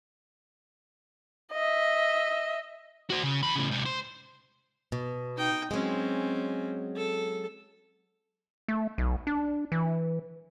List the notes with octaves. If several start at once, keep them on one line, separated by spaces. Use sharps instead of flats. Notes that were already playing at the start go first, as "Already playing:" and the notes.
D#5 E5
F#4 C5
C#3
E2 B5
A2 C#3
G#2 C3
C5
B2
D#4 G5
F#3 G#3 C4 C#4
A4
A3
B1
D4
E3